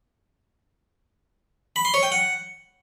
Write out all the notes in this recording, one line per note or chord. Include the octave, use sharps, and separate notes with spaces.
B5
C6
C#5
G5
F#5